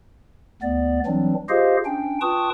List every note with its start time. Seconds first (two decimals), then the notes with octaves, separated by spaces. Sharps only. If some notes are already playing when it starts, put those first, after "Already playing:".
0.62 D2 B3 D5
1.06 E3 F#3 G3 C4 D4
1.49 F4 G4 G#4 C5 D#5 F5
1.85 C#4 D4 G5
2.21 F4 B4 G5 A5 C#6 D#6